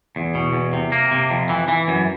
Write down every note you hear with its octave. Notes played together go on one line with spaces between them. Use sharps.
E2
B2
E2
C3
A#3
C3
F2
E3
E3
F#2